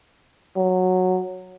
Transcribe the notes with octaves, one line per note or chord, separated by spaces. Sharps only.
F#3